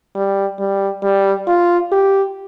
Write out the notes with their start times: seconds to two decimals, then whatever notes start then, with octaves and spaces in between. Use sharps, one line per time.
0.15 G3
0.59 G3
1.03 G3
1.47 F4
1.92 G4